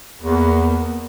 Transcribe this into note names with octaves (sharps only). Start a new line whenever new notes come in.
E2 A#3 B3